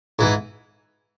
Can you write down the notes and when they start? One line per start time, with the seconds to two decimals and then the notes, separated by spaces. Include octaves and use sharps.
0.19 G#2 E3